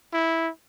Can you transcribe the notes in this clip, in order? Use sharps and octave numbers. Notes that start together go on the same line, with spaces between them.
E4